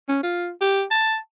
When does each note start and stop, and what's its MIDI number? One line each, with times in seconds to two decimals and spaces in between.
0.08 0.18 61
0.23 0.50 65
0.61 0.83 67
0.91 1.16 81